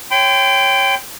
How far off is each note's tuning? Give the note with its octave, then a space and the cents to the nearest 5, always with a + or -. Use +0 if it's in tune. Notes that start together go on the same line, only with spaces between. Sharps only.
C#5 -10 G5 +0 C6 -40